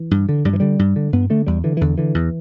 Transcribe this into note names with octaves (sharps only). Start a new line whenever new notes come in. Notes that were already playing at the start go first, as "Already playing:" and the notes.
Already playing: E3
G2
D3
G2 G3
E3
D3 G3
G2
D3
G2 B3
D3 A3
E2 G3
D3 E3
E3
E2 D3
D3 E3
E2